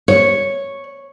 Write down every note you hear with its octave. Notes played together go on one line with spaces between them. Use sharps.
C#5